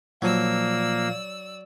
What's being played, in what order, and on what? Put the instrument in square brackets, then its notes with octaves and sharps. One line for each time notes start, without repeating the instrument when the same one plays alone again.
[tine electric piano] A#2 F3 [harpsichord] F#3 [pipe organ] A#3 [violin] D5 E6